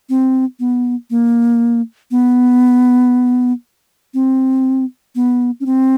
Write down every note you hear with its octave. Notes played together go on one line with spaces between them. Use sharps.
C4
B3
A#3
B3
C4
B3
C#4
C4